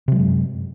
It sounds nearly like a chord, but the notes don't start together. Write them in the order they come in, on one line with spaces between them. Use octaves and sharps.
C3 F#3 G#3 F#2